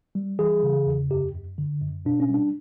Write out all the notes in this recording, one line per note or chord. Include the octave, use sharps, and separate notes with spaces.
G3
E3 G#4
C#3
E2
F#2 G4
F#2
D3
F#2
B2 D4
C#4
G3 D4